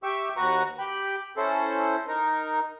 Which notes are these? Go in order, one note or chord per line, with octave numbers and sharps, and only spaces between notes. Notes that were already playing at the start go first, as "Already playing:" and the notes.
G4 E5 G5 C#6 E6
D#2 F#4 B4 F#5 A#5 C#6
G4 G5 B5
C#4 E4 A4 C5
D#4 A#4